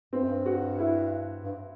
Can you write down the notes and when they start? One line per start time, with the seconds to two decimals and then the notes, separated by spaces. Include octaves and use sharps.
0.13 G2 C4
0.21 F#2
0.28 G2
0.46 F#4
0.79 E4
1.44 G2